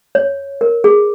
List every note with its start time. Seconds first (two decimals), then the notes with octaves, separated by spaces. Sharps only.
0.15 C#5
0.61 A#4
0.84 G#4